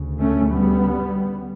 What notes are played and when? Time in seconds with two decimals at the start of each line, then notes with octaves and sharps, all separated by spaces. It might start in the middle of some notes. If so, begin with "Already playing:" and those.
Already playing: D2 C#3
0.20 A3 C#4
0.51 G3 B3